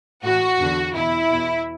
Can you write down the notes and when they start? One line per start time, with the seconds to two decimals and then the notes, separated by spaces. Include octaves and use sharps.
0.23 A2 E3 F#4
0.59 E2 D3
0.95 E2 B2 E4
1.30 E2 B2